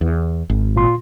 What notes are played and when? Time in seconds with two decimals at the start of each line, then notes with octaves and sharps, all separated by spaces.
0.01 E2
0.50 G#1
0.76 A#2 F4 C6